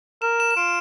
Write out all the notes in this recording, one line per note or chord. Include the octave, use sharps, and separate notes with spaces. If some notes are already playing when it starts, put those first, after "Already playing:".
A#4 E7
E7
E7
F4 D7